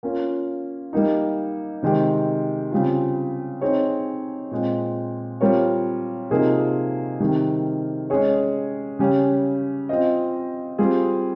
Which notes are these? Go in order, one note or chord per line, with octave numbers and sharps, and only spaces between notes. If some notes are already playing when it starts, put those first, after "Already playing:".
A#3 C#4 F4
G3 A#3 D#4
C3 D#3 G#3 C4 G4
C#3 G3 C4 F4
C4 D#4 G#4 C#5
A#2 G#3 C4
G3 C4 F4 A#4 C#5
C3 F3 A#3 D#4 G#4
C3 D#3 G3
G#3 C#4 G#4 C#5
C#3 G3 C#4 G4
C4 F4 C5 D#5
G3 C4 F4 G#4